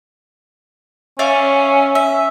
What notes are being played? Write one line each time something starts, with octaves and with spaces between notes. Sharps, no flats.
C#4 D5 E5 F5
E5